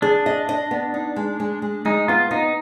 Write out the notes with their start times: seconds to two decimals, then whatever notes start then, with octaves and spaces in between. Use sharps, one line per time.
0.02 D4 G#4
0.26 D#5
0.49 D#5
0.71 B3
0.94 D#4
1.16 G#3
1.40 G#3
1.62 G#3
1.85 G#3 D#4
2.08 B3 F4
2.31 B3 D#4